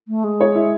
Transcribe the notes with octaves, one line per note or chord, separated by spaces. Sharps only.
A3
G#3
C#5
E4